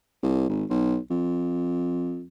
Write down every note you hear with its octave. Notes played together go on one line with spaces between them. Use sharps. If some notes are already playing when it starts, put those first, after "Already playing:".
C2
G#1
B1
F2